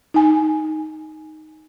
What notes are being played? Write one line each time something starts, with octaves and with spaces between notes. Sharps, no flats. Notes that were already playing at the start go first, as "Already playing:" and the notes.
D#4 G#5